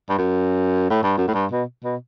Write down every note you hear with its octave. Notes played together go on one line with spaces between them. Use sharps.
G2
F#2
A2
G2
F#2
A2
G2
B2
B2